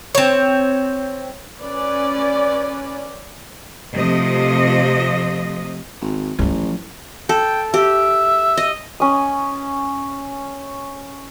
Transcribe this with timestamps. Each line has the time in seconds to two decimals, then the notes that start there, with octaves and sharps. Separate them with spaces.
0.15 C4 C#5
1.62 C#4 B4 D5
3.93 C3 F3 A3 D#5
6.01 G#1
6.39 A1 F3 F#3
7.29 A4 G5
7.74 G4 E5
8.57 D#5
9.00 C#4 D#6